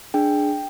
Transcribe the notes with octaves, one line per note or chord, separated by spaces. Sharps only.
D4 G#4 G5